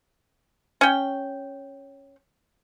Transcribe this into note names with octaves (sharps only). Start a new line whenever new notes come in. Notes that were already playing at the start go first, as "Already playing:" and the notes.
C#4 G5